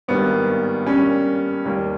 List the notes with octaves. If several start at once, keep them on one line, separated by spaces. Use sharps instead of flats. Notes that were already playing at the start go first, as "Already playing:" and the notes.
G#1 G2 D#3 G3 A#3 B3
G2 G3 A#3 C#4
D#2 D#3 G3 A#3